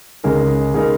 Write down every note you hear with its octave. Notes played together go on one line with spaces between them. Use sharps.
C#2 C#3 G#3 D#4 A#4
C#3 G#3 D#4 A#4